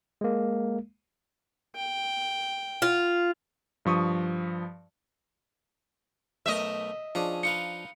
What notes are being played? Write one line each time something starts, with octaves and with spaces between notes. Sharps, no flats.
G#3 A#3
G5
F4
G2 F3 C#6 D#6
B1 A3 A#4 D#5 E5
F3 C#4 D4 G#4
D#4 F4 B4 C#7